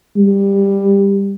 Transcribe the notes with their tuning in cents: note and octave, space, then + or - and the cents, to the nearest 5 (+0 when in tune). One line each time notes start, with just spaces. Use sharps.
G3 +15